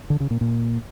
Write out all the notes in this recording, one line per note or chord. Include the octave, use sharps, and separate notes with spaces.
D3
C#3
A#2
A#2